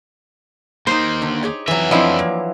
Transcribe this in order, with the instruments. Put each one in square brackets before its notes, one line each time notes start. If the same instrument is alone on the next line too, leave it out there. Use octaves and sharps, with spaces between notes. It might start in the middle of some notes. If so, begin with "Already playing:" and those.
[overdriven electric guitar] D#2 A#3 [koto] D#4 C5
[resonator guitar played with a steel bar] D3
G4 G#4 C#5
[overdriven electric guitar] F2 E5 [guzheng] E3 F#3
[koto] F3 E4 [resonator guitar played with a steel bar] C4 D4 D#5
[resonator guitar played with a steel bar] A#3